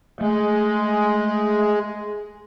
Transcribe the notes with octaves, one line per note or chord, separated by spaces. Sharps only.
G#3 A3